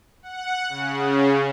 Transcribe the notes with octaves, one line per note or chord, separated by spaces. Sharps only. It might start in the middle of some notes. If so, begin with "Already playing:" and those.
F#5
C#3